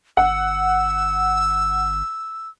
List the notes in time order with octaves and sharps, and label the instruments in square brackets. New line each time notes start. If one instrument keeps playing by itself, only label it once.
[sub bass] G1 [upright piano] F#5 [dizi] E6